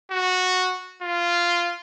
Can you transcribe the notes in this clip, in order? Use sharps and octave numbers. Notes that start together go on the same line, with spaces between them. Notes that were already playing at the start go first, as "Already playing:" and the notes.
F#4
F4